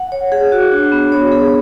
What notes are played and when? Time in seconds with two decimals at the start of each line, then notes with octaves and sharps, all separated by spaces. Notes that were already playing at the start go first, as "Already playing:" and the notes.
Already playing: F#5
0.12 C#5
0.32 G#4
0.52 F#4
0.72 D4
0.92 B3
1.12 C#5
1.32 G#4